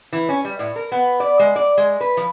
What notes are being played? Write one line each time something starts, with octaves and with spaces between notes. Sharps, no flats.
E3
C#4
G3
A2
A#4
B3
D5
G#3
D5
G#3
B4
F3